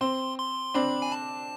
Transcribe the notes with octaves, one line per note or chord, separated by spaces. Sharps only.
C4 C6
C6
C4 D4 B5
G#5
A5